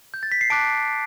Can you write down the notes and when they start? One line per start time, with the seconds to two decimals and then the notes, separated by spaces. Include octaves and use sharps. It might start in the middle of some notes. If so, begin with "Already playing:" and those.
0.14 G6
0.23 A6
0.32 B6
0.41 C7
0.50 A5 D6 F#6 D7